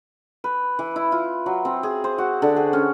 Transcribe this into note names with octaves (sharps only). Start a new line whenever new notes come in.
B4
E3
E4
F4
F#3
C4
G#4
C5
F#4
D3
G#4
C#4